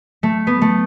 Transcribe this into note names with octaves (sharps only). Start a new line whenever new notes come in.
A3
B3
A3